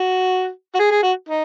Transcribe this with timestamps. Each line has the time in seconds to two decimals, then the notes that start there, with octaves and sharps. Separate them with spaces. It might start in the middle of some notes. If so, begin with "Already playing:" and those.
Already playing: F#4
0.74 F#4
0.79 G#4
0.91 G#4
1.03 F#4
1.28 D#4